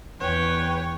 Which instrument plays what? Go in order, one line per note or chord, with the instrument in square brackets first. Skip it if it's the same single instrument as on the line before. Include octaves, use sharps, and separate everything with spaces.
[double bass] E2 [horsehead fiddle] B4 G5 [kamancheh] C#5